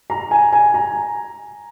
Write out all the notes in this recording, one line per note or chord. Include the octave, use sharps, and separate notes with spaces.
A#5
G#5
G#5
A#5